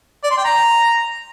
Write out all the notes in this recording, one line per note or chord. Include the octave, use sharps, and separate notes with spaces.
D5
C6
G5
A#5